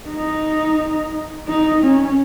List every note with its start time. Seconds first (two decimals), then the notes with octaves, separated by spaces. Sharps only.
0.09 D#4
1.48 D#4
1.83 C#4